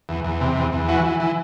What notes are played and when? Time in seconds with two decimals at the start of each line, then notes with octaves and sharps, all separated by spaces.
0.09 E2
0.24 E2
0.41 C3
0.56 E2
0.72 E2
0.88 E3 F#4
1.04 E3
1.20 E3